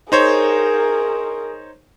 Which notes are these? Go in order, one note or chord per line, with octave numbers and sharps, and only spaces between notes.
D#4 G#4 A#4 C5 C#5